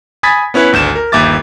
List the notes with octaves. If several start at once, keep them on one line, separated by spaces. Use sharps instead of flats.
G#5 B5 D#6 G#6 A6 B6
B3 C#4 E4 B4 C#5
G#1 D2 G6 E7
A#4
G1 D#2 E5 D6 A6